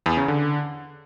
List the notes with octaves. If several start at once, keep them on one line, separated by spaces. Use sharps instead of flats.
E2
C#3
D3